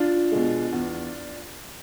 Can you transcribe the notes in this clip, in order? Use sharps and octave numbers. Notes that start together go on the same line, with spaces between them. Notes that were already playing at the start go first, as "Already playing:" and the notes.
Already playing: D4 F4
B2 G#3
E2